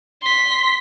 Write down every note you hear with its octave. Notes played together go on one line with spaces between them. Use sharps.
C6 B6